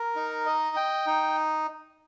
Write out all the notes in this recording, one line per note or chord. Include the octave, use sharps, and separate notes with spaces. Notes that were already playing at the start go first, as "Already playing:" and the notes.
Already playing: A#4
D#4
D#5
G5
D#4